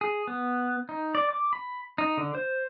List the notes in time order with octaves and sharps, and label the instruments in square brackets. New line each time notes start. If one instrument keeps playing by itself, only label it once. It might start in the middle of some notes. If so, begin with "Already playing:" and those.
[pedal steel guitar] G#4
B3
D#4
D5
D6
B5
D#4
D3
C5